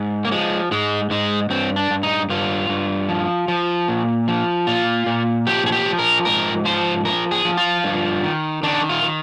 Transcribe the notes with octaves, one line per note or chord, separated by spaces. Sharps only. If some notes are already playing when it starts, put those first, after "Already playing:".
Already playing: G#2
A#3
F3 G#3
G#2 G#3
G#2 G#3
G2 C4
D4
G2
D#4
G2 F4
G2
F3
F3
A#2
F3
A#2 F4
A#2
F3 G4
G#4
G4
F3
A#4
G#2 A#4
F3 C5
F3 A#4
G#4
F3
F4
G2
D#3
D#3 D4
F4
D#3